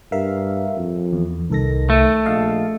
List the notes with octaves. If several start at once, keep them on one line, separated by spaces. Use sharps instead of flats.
G2 A#4 E5 F5
F2
E2
C2 D#3 A4 A#6
A3
A#1 D#5 F5 A5